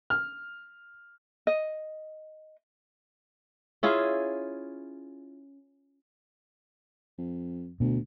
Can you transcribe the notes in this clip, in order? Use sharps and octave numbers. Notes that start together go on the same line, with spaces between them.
F6
D#5
C#4 E4 F4 G#4
F2
D2 B2